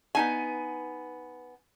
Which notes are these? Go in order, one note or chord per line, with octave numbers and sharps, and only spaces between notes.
B3 D#4 G#5